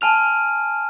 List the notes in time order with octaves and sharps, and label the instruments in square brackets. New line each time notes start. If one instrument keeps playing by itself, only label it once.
[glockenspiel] G#5 A5 F6 F7